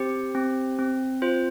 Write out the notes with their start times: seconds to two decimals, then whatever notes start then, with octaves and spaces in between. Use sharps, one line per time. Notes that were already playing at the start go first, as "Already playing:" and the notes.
Already playing: C4 G4 C5
0.35 C4
0.79 C4
1.22 F4 C5